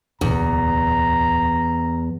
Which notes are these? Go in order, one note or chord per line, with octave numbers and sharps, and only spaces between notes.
D1 E2 B2 A#5